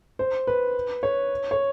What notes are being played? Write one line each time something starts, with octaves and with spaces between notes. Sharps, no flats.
C5
B4
C#5
C#5